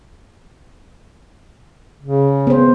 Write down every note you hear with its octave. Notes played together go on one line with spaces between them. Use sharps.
C#3
B3 C5